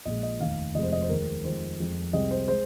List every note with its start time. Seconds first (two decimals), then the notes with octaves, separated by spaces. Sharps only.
0.05 A#1 A#2 G#3 D#5
0.23 D#5
0.40 F1 D#2 D#3 F5
0.75 F1 F2 C3 F3 G#3 D#5
0.83 C5
0.92 D#5
1.01 C5
1.09 D#2 D#3 G#3 A#4
1.44 F2 D#3 G#3 C5
1.79 F2 F3 G#3
2.13 C2 C3 G#3 D#5
2.31 C5
2.48 G#3 C5